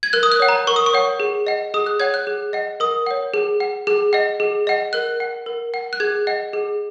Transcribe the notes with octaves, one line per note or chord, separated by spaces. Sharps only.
G#6
A#4 F#6
D#6
F#6
C#5 F#5
A#5
A#4 C#6
D#6
C#6
C#5 F#5
G#4
D#5 F#5
G#4 D#6
F#6
C#5 F#5 G#6
F#6
G#4
D#5 F#5
A#4 D#6
C#5 F#5
G#4
F#5
G#4
D#5 F#5
G#4
D#5 F#5
A#4 F#6
F#5
A#4
F#5
F#6
G#4 G#6
D#5 F#5
G#4